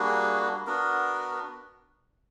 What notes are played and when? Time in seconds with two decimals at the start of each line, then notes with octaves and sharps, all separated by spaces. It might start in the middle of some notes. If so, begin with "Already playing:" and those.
Already playing: G3 A#3 D4 F#4 G#4
0.67 B3 D4 F#4 A#4